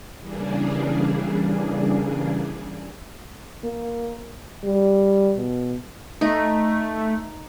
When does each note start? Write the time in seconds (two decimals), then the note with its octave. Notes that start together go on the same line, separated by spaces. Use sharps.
0.18 C#3 E3 G3 A#3 D4 G#4
3.64 A#3
4.64 G3
5.38 B2
6.21 A3 D#4